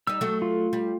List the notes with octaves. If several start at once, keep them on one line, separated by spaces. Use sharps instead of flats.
G3 D#4 E6
F#3 A3
F4
G3